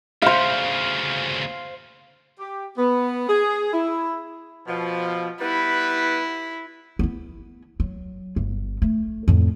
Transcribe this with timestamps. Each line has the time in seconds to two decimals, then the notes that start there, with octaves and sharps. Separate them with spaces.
0.22 D2 C#3 C5 F5
2.39 G4
2.77 B3
3.28 G#4
3.73 E4
4.67 B2 F3
5.41 G3 B3 E4 B4
6.99 B3 E4
7.80 F#3
8.36 G1
8.82 A3
9.28 F2 A2